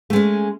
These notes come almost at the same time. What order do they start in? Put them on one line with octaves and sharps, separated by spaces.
A3 G#3 C#4